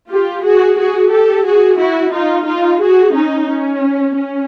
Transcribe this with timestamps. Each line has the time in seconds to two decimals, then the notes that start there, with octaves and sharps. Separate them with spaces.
0.10 F4 G4
0.44 F#4 G#4
0.78 F#4 G#4
1.11 G4 A4
1.45 F#4 G#4
1.78 E4 F#4
2.12 D#4 F4
2.46 D#4 F4
2.80 F#4 G#4
3.13 C#4 D#4
3.47 C#4
4.15 C#4